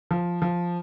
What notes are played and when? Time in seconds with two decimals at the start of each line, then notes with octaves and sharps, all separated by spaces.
0.11 F3
0.42 F3